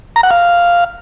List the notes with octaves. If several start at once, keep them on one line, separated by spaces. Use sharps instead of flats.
A#5
F#5
F5